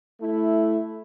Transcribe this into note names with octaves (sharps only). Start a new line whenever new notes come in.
A3 E4